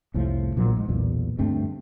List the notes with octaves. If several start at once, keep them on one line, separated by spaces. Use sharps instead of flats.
C2 F2 A2 F3
A#1 A#2 F3 F#3
G#2
B1 E2 A#2
D2 G2 A3 C4